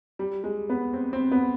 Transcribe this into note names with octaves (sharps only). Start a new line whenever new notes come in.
G3
G#3
B3
C4
C4
B3